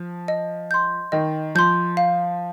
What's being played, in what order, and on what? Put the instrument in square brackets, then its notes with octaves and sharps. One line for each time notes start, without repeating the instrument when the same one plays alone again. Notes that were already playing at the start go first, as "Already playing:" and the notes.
Already playing: [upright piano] F3
[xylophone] D#5
C6 G6
[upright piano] D#3 [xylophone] D#5
[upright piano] F3 [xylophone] C6 G6
[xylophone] F5